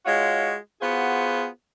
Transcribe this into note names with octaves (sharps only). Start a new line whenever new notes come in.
G#3 F4 F#4 C#5 D#5
B3 F4 F#4 G#4 C5